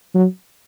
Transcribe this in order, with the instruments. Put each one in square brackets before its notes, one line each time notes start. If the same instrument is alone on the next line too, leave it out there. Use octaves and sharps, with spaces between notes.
[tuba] F#3